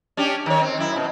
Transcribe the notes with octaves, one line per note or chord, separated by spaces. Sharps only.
C#4 D4 G4
D#3 C#5
C4
F#2 E4
B2